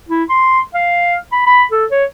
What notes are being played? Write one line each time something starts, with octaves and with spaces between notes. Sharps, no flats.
E4
C6
F5
B5
B5
A4
C#5